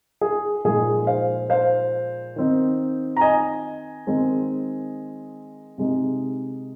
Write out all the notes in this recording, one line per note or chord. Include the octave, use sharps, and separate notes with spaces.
G#4
A#2 F3 G#3 D#4 G#4
C5 F5
C5 F5
D#3 C4 D#4
A#5
D#5 G#5
D#3 G#3 C4 D#4
C3 G#3 D#4